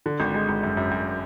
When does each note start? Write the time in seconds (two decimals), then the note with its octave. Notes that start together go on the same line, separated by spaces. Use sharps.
0.06 D3
0.20 G#1
0.34 G#3
0.49 G#1
0.63 F#2
0.77 F#2
0.91 F#2